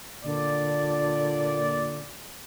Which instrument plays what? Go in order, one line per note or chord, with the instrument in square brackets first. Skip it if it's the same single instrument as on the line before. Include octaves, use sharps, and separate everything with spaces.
[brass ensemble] A#2 D5 [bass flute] D3